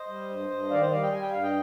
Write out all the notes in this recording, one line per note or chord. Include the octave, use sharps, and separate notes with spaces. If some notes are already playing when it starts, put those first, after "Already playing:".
Already playing: C5 D#5
G3
G2
G2
D#3 D5 F5
C5 D#5
G3 D5 F5
D#5 G5
G3 G#5
G5
G2 F5
D#5 G5